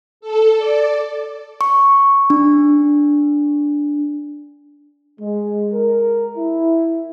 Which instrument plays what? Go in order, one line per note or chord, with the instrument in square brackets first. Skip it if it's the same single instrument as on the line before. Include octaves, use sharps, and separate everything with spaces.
[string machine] A4
D5
[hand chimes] C#6
D4
[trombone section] G#3
A#4
E4